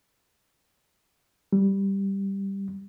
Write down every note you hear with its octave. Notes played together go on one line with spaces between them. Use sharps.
G3